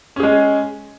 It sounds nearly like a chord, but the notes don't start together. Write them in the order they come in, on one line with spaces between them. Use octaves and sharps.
C#4 G#4 G#3